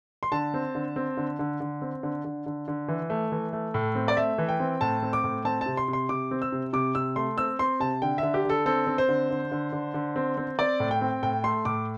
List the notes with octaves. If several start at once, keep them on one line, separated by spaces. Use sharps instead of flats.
C6
D3 A5
C4
D3
C4
D3
D3
D3
C4
D3
D3
D3
D3
E3
A3
E3
A3
A2
C4
D5
A3 E5
E3
G5
C4
A2 A5
C4
D6
A2
C4 A5
A5
C3
C6
C3
C6
C3 D6
C4
E6
C3
C3 D6
C3 E6
A3 C6
C4 E6
C4 C6
C3 A5
D3 G5
D3 E5
G4
D3
A4
C4 A4
C4
C5
D3
D3
D3
D3
D3
C4
C4
C4 D5
A2
G5
C4
A2 G5
A3 C6
A2 D6